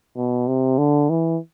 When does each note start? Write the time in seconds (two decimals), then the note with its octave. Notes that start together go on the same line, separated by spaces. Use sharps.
0.17 B2
0.48 C3
0.78 D3
1.10 E3